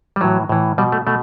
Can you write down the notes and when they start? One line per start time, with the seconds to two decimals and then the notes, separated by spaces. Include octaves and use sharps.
0.16 G3
0.21 A2 E3 F#3
0.49 A2 E3
0.78 B2 G3
0.92 A3
1.07 B2 A3